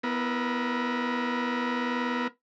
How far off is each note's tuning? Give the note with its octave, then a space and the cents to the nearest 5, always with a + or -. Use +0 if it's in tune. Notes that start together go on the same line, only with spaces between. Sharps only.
B3 +0 E4 +0 A#4 +25